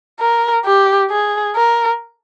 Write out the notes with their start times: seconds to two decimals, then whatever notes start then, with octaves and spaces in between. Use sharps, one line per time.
0.20 A#4
0.65 G4
1.10 G#4
1.56 A#4